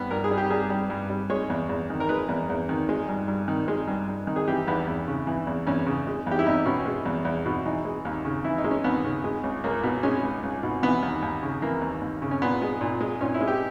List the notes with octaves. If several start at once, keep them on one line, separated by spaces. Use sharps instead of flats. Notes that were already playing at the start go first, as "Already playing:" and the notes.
Already playing: G2 G3 B3
G2 A#4
G#4
G3
G4
G2 G#4
G3
G2
G3
G#3 C#5
E2
E2
D#3
A#4
G#3 B4
E2
E2
D#3
G#3
G2
G2
D#3
G#3
G2
G2
D#3
G#4
E3 G4
E2 B3
E2
C#3
E3
E2
E2 C#4
C#3
G#3
E2 G4
E4
E2 D#4
B2 C#4
G#3
E2
E2
B2
E3 D#4
G#3
D#2
C#3
E3 E4
D#4
G#3
C#4
D#2 B3
C#3
G#3
C#2
C#2 A#3
B2 B3
G#3 C#4
C#2
C#2
B2
E3 B3
D#2
D#2
C#3
E3 A#3
D#2
D#2
C#3
C#4
A#2 B3
G#3
A#2
G#3
A#2 C#4
E4
G#3
G4